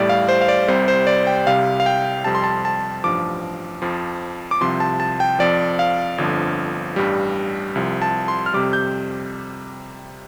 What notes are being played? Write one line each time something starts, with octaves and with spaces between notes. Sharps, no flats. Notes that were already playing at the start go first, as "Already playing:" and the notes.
Already playing: A1 A2 G3 D5
F5
C5
F5
D5
C2 C3 G3 C5
C5
D5
G5
C2 C3 G3 F5
F5
G5
F2 C3 G3 A5
C6
A5
A5
A1 G2 F3 D6
F2 F3
D6
C2 C3 F3 C6
A5
A5
G5
F2 F3 D5
F5
G1 F2 D3 F3
A1 G2 G3
C2 C3 F3
A5
C6
F6
F2 C3 G3 D6
G6